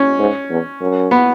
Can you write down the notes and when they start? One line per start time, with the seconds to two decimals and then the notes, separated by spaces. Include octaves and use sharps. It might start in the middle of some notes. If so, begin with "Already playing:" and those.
Already playing: C#4
0.19 G#2
0.50 E2
0.81 F#2
1.11 B3